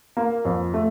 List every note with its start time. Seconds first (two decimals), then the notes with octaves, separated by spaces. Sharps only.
0.17 A#3
0.45 F2
0.74 A3